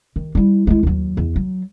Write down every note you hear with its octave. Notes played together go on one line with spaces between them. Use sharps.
D#3
G3 E4
G#3 E4
D#2 F#3
E2
F#3